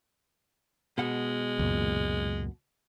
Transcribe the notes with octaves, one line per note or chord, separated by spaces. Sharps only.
B2 G#3 F#5
C#2 F#2 A#2